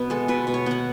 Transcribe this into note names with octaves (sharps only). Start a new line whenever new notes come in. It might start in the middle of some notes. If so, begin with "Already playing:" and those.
Already playing: B2 B3
G#3 A4
B2 B4
B2
C#5
B3 F#5